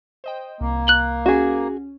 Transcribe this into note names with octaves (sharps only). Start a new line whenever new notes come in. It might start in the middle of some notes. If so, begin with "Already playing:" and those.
C5 D#5 G5
C2 A#3
F#6 F#7 G7
C#4 F#4 G#4